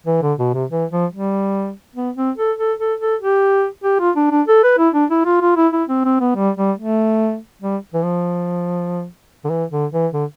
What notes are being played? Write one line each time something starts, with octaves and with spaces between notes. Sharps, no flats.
E3
D3
B2
C3
E3
F3
G3
B3
C4
A4
A4
A4
A4
G4
G4
F4
D4
D4
A4
B4
E4
D4
E4
F4
F4
E4
E4
C4
C4
B3
G3
G3
A3
G3
E3
F3
D3
E3
D3
E3
D3